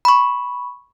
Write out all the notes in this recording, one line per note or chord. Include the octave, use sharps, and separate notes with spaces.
B5 C#6